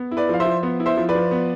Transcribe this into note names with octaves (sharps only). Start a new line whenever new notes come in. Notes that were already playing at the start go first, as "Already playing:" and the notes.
Already playing: B3
E4
B4 D5
F3 F5
C5 E5
F3
B3
E4
C5 E5
F3
B4 D5
F3
B3